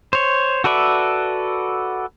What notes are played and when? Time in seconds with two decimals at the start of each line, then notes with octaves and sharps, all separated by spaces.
0.13 C5 C#5
0.64 F#4 A4 B4 D5 E5